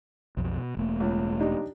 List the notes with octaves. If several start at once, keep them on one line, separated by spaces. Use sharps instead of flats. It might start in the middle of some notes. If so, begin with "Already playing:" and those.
B1 F2
B2
E1 A3 A#3
C#2
D4 D#4 G4